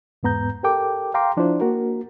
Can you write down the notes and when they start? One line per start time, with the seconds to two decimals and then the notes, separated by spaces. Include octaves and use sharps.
0.23 E2 G#2 B3 A#5 G6
0.63 G4 A4 A#4 G5 D6
1.14 F5 G5 A#5 C6 D6
1.37 F3 D4 E4 F4 C5 D5
1.61 A#3 F#4 A#4